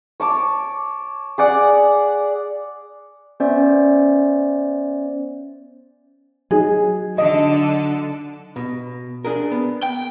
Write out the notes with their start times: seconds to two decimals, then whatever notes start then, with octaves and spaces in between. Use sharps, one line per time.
0.20 C#5 A5 D6
1.38 G#4 D5 F#5
3.40 B3 C#4 C5 D5 E5
6.51 F#3 D#4 G#4
7.18 D3 A4 D#5
8.56 B2
9.25 D4 G#4 A#4
9.52 B3
9.83 G5